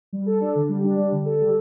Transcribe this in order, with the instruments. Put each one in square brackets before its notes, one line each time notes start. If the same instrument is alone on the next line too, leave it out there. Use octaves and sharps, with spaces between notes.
[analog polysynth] G3
A4
D4
D3
G3
D4
G3
D3
A4
G3